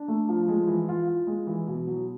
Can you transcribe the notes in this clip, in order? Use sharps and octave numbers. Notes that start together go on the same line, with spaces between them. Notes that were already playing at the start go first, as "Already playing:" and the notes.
Already playing: D4
A3
F3
G#3
E3
F4
F4
G#3
E3
B2
F#3